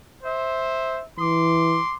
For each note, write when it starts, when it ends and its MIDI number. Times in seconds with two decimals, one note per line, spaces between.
0.24 1.02 72
0.24 1.02 76
1.19 1.80 52
1.19 1.95 84
1.19 1.95 86